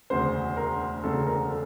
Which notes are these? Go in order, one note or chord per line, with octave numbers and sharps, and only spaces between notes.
E1 D2 C#3 C5
A#4
E1 D2 C#3 A4
A#4
A4